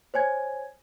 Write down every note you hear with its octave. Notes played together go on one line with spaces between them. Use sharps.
C5 C#5 G#5 G#6